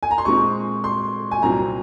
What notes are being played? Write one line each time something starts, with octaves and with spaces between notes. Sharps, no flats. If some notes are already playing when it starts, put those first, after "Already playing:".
G#5
A#5
C6
A#2 G#3 C4 C#6
C6
G#5
C2 A#2 F#3 C4 A#5